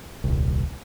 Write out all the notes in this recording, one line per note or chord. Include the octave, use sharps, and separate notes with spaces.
D#1 C2